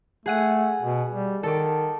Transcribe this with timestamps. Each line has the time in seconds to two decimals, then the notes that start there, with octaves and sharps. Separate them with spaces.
0.26 A3 G#4 F#5 D#7
0.82 B2
1.11 G3
1.43 D#3 A4 D6